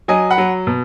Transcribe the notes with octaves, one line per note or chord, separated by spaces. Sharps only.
F#3 D#5 G#5
F#5 B5
F#3
B2